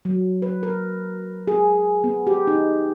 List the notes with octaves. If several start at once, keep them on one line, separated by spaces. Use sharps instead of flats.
F#3
B4
A#4
G#4
B3
G4
D#4